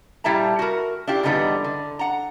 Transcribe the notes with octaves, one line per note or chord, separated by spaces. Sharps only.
A#2 G3 E4 E5 A5 A#5
F#4 A#4
D4 E4 F4 G4
E2 G#2 D3 G3 B3 D#4
D3
F#5 A#5